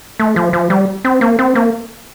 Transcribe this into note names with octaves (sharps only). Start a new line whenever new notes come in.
A3
F3
F3
G3
C4
A#3
C4
A#3